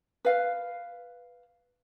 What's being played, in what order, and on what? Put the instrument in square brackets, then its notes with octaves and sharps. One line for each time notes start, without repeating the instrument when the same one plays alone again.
[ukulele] B4 F5